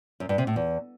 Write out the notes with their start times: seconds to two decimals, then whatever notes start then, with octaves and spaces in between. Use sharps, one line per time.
0.20 F#2
0.29 G2
0.38 C3
0.47 A2
0.56 E2